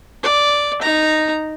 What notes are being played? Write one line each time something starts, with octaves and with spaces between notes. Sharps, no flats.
D5
D#4 A#5